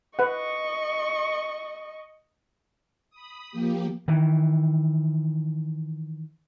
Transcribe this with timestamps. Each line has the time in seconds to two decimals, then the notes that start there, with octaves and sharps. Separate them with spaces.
0.19 B4 D#5 F#5 C#6
3.10 B5 D#6
3.52 F3 A#3 G4
4.08 D#3 E3